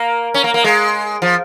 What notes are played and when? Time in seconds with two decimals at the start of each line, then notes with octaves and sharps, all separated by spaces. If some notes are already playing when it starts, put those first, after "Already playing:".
Already playing: A#3
0.34 C#4
0.44 A#3
0.54 A#3
0.64 G#3
1.22 F3